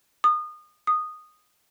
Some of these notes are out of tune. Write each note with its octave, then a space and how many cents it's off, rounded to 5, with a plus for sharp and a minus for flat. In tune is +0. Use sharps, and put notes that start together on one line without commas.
D#6 -30
D#6 -10